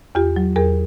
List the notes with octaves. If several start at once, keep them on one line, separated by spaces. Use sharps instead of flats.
E2 F4 G4
F#3
E2 G#4 A#4